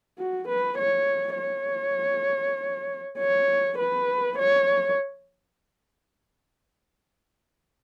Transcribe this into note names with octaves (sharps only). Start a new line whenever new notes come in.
F#4
B4
C#5
C#5
C#5
B4
C#5